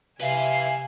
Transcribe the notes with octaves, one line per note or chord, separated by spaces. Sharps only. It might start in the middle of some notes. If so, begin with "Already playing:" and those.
C3 B4 E5 F5 G#5